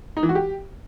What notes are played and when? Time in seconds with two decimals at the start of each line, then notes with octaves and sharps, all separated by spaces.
0.17 D#4
0.23 E3
0.29 F#4
0.35 G4